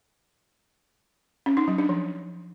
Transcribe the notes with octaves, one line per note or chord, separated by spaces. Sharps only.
C#4
D#4
F#3
D4
F3